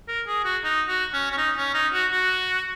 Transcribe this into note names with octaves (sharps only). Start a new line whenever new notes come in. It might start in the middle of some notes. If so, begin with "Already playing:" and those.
A#4
G#4
F#4
D#4
F#4
C#4
C#4
D#4
C#4
D#4
F#4
F#4